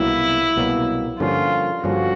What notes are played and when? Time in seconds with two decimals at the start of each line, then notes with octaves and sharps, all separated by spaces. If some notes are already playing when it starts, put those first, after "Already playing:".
Already playing: C2 B2 F#3 A#3 E4
0.56 C2 B2 F#3 A#3
1.19 G2 D3 F3 A#3 C#4 F4
1.84 G2 D3 F3 A#3 C#4 F#4